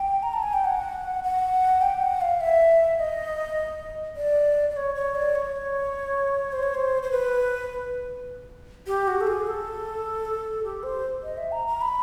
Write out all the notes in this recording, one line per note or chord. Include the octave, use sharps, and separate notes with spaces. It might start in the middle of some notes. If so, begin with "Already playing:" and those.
Already playing: G5
A#5
A5
G#5
G5
F#5
F#5
G5
F#5
F5
E5
D#5
D5
D5
C#5
C#5
D5
C#5
C5
C#5
C5
C5
B4
G4
F#4
A4
G#4
A4
G4
C5
D#5
E5
A#5
A#5
B5